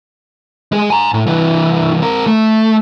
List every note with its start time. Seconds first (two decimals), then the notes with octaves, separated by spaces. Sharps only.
0.72 G#3 G#4
0.90 G#5 A#5
1.14 A2
1.27 C2 E3
2.02 C4 A#4
2.27 A3